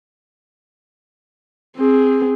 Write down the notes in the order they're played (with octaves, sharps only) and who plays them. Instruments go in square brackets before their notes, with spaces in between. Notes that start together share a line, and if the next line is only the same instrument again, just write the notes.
[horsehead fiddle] C4 G#4